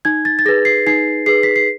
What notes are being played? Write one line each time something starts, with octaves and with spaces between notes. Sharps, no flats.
D#4 G#6
A6
A6
G#4 B4 A#6
C7
D#4 C7
G#4 B4 C7
B6
C7